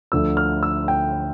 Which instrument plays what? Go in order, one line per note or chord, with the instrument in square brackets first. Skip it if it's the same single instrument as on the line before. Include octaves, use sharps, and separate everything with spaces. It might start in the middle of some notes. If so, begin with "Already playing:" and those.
[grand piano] D2 D3 F3 E6
F6
E6
G5